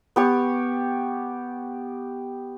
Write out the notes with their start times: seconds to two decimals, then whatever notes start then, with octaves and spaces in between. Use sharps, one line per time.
0.16 B3 G4 C#6